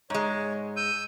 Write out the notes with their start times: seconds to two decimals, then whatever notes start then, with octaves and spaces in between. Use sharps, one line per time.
0.10 G#2 G#3 C#5
0.77 E6 G6 D#7